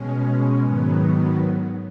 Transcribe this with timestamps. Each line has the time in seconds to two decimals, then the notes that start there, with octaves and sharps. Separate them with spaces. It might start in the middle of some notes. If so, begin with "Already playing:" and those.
Already playing: B2 G#3 C#4
0.61 G#2 D#3 F#3 B3